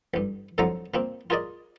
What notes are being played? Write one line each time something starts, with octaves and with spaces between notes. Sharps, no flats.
A1 G2
F2 A2 D3 F3 F#3 A#5
A#2 A#3 C4
F4 G#4 A#4 D5 D#5